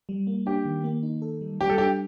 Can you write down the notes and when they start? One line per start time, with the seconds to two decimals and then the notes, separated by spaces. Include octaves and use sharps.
0.09 G3
0.27 A#3
0.46 D4 G4
0.65 D#3
0.84 A#3
1.03 D#4
1.22 A4
1.41 G3
1.60 G3 G4
1.70 A4
1.78 D4 G4